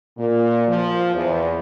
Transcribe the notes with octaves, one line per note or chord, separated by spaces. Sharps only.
A#2
F3
E2